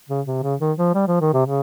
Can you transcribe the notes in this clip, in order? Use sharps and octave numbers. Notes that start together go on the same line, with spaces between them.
C#3
C3
C#3
D#3
F3
G3
F3
D#3
C3
C#3